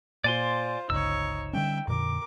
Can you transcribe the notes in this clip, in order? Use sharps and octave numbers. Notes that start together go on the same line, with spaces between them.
A#2 F4 C5 D5 G#5 C6
G1 C#2 D#4 C#5 E6
D3 G3 C#4 E5 G5
F2 A#2 D3 A#4 D6